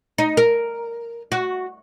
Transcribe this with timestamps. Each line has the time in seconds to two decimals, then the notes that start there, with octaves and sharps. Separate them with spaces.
0.18 D#4
0.37 A#4
1.32 F#4